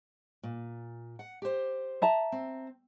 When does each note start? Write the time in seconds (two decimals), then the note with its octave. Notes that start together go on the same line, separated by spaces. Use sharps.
0.43 A#2
1.19 F#5
1.42 G4 C5
2.02 E5 A5 A#5
2.32 C4